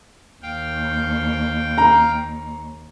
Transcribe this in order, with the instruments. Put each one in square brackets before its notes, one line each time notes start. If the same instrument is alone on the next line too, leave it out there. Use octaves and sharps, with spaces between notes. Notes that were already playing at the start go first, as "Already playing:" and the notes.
[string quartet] D#2 [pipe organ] F5 G5
[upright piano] A#5